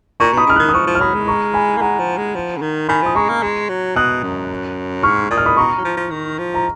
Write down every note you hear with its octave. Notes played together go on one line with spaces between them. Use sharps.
A#2 A#5 C#6
B2 B5 D#6
C#3 F6
D#3 D#6 F#6
D#6
F3 C#6 F6
F3
F6
F#3 B5 D#6
G#3
A#5 C#6
G#5 B5
A#3
G#3 F#5 A#5
F3
G#3
F3
C#3
D#3
D#3 G#5 B5
F3 D#6
G#3 A#5 C#6
A#3
G#3
F#3
B2 D#6 F#6
F#2
G#2 C#6 F6
A#2 D#6
F6
B5 D#6
B2 A#5 C#6
F#3
F3
F3
D#3
F3
A#5